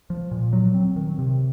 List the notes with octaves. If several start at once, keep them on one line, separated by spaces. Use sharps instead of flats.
F3
A#2
F#3
C4
D#3
C3